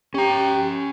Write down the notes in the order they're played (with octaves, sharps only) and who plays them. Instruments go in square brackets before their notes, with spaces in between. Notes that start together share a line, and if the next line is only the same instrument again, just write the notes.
[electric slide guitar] C#4 A#5 [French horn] G4